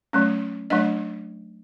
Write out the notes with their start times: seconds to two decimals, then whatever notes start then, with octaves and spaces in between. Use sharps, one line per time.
0.13 F#3 A3 C#4
0.70 F#3 A3 D4 D#5